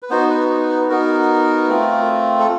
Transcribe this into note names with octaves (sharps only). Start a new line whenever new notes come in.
B4
B3 D#4 F#4 C5
B4
B4
B3 D#4 F#4 A#4
A3 C4 F4
A4